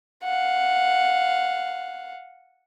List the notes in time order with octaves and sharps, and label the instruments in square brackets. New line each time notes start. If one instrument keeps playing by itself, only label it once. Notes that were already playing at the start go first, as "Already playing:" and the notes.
[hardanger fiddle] F5 F#5